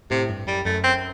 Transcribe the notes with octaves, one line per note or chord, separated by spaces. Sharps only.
A2 C3
G2
F#2 G3
F#2 A3
C4